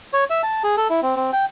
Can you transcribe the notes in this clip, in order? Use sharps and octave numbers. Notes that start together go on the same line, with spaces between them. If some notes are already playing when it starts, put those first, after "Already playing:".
C#5
E5
A5
G#4
A4
E4
C4
C4
G5